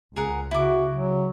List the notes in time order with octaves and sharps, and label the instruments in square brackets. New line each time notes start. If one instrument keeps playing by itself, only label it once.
[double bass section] C#2 [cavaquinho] G#4 A#4 F#5
[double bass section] C#3 [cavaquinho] E4 D6 [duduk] F#4
[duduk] F#3